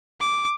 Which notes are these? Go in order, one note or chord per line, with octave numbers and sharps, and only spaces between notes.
D6